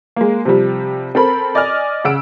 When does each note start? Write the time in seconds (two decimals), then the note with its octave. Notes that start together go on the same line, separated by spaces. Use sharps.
0.16 G#3 A#3
0.45 C3 F3 G3
1.15 C4 A4 A#4 B5
1.55 D5 D#5 G#5 F6
2.04 C#3 F#5 E6 D7